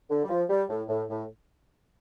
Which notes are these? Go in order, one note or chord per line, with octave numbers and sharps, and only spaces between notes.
D3
G3
F3
G3
A2
A2
A2